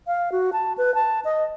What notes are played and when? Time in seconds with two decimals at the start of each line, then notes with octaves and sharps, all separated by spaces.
0.07 F5
0.32 F#4
0.53 A5
0.78 B4
0.95 A5
1.25 D#5